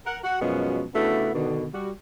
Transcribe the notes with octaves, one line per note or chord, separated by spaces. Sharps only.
A#4 F#5
F#4 F#5
F#2 B2 F3 G#3 C#4 F#4
C#3 A3 B3 D4 E4 F#4
B2 D3 D#3
G3 F#4